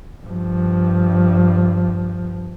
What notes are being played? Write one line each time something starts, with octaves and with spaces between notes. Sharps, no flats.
G2 F3